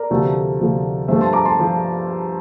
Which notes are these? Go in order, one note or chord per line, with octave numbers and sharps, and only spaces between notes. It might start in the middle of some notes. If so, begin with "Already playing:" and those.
Already playing: A#4 D5
D2 C3 F3 A3
D2 C3 F3 A3
G2 F3 A3 C5 E5
A5 C6
A#5 D6
A5 C6
F3